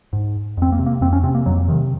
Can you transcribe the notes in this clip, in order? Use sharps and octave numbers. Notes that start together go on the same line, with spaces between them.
G#2
F2 C4
A#3
C3
A#3
F2 C4
C#4
C3 C4
A#3
F2 F#3
C3 D#3